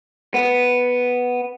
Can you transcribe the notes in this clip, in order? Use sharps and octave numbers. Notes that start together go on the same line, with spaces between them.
B3